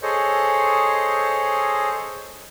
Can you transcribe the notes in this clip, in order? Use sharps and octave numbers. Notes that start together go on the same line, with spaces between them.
G#4 A4 C5 C#5 D#5